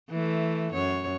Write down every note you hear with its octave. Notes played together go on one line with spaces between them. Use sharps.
E3 A3
F#2 C#5